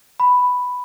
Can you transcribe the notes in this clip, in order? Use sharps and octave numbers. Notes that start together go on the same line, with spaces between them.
B5